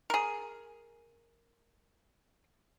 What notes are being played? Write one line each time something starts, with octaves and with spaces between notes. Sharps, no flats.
G#4 A#4